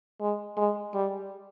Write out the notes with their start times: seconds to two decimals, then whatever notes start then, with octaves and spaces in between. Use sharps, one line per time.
0.20 G#3
0.57 G#3
0.94 G3